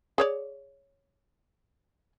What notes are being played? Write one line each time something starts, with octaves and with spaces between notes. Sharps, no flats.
G#4 C#5 D5